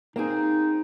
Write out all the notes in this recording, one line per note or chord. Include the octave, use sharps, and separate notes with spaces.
A#3 C4 D#4 G#4